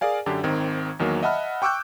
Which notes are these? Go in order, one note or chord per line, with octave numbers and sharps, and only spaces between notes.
G#4 A#4 D5 F5 G#5
F#2 D3 D4 G4
G#1 D#3 C4 G#6
E2 D#3 F#3 A#3
D#5 E5 F#5 A5 B5 F6
G5 C#6 D6 E6 F#6 G6